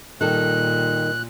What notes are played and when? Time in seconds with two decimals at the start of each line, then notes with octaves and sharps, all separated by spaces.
0.21 A#2 D#3 G3 A4 F#6